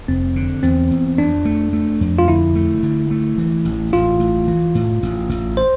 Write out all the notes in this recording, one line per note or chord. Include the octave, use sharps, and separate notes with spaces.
F1 C4
D3
E2 C4
E2
F2 D4
A3
A3
F2
F4
D3 E4
A3
D3
A3
E3
A1
A1 F4
A1
E3
A2
A1
A1
C5